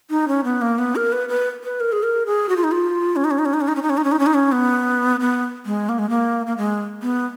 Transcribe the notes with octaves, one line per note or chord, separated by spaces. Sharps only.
D#4
C#4
B3
A#3
B3
A#4
B4
B4
B4
A#4
G#4
A#4
G#4
F#4
F4
D#4
F4
C#4
D#4
C#4
D#4
C#4
D#4
C#4
D#4
C#4
D#4
C#4
D#4
C#4
D#4
C#4
D#4
C#4
B3
B3
G#3
A#3
G#3
A#3
A#3
G#3
B3